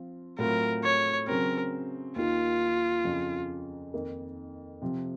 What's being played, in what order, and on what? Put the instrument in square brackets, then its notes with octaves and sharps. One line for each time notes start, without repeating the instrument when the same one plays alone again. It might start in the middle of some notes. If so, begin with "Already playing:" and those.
Already playing: [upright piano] F3 C4 F4
[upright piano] A2 F#3 C4 F4 [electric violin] A#4
[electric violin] C#5
[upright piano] C#3 F#3 C4 [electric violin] A#4
[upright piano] D#2 D#3 A#3 [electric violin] F4
[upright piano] F2 C#3 F3
F2 D#3 A#3 D#4 A#4
C3 F3 C4